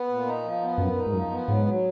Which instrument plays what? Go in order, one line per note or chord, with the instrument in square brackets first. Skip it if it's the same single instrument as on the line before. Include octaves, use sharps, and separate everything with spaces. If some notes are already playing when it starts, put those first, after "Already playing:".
Already playing: [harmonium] B3
A#2
D#4
F3
B3
[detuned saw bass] F#2 [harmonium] A#2
[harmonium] D#4
[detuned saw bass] G#2
[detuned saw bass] F#2 [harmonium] F3
[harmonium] B3
[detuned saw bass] G#2 [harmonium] F#3
[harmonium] F#3